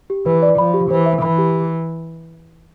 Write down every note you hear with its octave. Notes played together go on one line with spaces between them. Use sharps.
G4
E3 B4
D5
F3 B5
G4
E3 C5
E5
E3 B5
G4